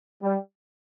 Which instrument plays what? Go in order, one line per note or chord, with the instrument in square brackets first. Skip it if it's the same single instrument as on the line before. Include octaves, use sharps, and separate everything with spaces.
[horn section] G3